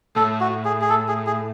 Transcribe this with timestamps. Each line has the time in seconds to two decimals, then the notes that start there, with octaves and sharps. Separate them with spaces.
0.16 A2 A4
0.40 F#4
0.65 G#4
0.81 G#4
0.90 A4
1.08 G#4
1.27 G#4